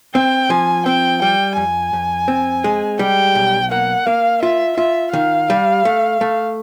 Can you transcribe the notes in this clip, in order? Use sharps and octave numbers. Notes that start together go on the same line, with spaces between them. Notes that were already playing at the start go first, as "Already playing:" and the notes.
C4 G5
F3 G#5
C4 G5
G3 G5
F2 G#5
F2
C4
G#3
G3 G5
B1
A#3 F#5
A#3 F5
F4 E5
F4 E5
D#3 F5
G3
A3
A3